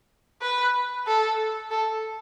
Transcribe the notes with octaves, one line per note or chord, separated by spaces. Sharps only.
B4
A4
A4